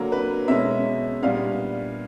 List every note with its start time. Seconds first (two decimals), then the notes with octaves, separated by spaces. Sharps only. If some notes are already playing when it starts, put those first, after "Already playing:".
Already playing: D3 F#3 A#3
0.12 B4
0.48 B2 G#3 C#4 E5
1.22 A#2 G3 B3 D4 F5